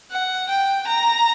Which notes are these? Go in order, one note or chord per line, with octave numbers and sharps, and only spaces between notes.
F#5
G5
A#5